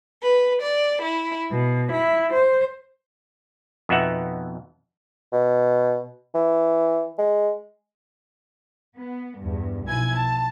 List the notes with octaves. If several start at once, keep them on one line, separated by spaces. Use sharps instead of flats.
B4
D5
E4
B2
E4
C5
F2 B2 B3 D#4 E5 F#5
B2
E3
G#3
B3
E2 G2
B1 F3 E4 G#5 G#6
A5